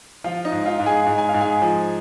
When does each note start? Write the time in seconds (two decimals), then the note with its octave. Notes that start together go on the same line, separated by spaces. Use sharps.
0.24 F3 F4 F5
0.45 D#4 D#5
0.52 G#2
0.66 F4 F5
0.80 G#2
0.86 G#4 G#5
1.06 G#2
1.18 G#5
1.29 F5
1.34 G#2
1.41 G#4 G#5
1.61 F3